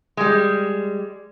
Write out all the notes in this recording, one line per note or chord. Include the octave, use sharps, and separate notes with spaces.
G3 G#3